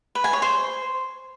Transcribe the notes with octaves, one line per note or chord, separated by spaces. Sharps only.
B4
G#5
C#5
C5